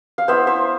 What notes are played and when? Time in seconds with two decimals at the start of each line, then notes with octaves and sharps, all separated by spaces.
0.18 F5
0.28 B3 E4 C5 E5
0.47 C5 E5